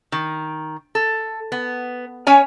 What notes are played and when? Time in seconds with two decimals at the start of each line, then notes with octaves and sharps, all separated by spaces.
0.12 D#3
0.95 A4
1.52 B3
2.27 C#4 C#5 G#5